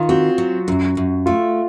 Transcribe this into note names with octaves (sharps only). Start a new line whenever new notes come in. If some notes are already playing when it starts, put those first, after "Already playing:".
Already playing: D#3 F4
C4 F#4
F#3
F#2
F#2
A3 F4